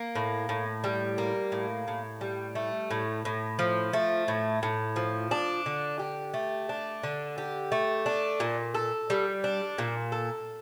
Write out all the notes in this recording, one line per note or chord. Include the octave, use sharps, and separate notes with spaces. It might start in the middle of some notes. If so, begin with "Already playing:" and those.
Already playing: A#3
A2
A2
G3
A#3
A2
A2
G3
A3
A2
A2
F3
A3
A2
A2
F3
D4
D3
G4
A3
D4
D3
G4
A3
D4
A#2
A4
G3
D4
A#2
A4